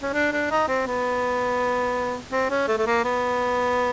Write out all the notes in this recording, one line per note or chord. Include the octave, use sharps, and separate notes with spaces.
C#4
D4
D4
D#4
C4
B3
C4
C#4
A3
A3
A#3
B3